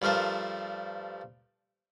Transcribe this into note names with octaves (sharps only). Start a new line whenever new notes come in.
G2 F3 A3 A#4 C5